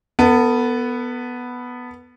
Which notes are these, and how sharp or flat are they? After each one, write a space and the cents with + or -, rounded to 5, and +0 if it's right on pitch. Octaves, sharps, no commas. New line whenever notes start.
B3 +0 A4 +35